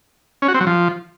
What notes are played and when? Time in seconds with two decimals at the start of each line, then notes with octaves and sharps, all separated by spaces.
0.42 C#4
0.48 F#4
0.54 C4
0.61 F#3
0.67 F3